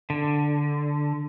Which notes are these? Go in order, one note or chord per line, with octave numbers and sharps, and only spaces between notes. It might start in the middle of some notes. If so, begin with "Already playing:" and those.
D3